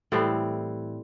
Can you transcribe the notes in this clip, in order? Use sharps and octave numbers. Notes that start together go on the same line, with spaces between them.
A2 E3 G3 C4